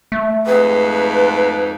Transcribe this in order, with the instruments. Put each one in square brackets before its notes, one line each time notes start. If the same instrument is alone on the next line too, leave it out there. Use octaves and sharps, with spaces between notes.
[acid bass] A3
[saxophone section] F2 G#2 [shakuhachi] B4